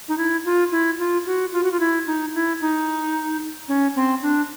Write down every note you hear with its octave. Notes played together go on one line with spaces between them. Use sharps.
D#4
E4
F4
E4
F4
F#4
F4
F#4
F4
E4
D#4
E4
D#4
C#4
C4
D4